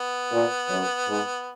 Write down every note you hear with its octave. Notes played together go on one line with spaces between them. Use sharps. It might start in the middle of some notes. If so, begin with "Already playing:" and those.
Already playing: B3
A#2
F#2
G#2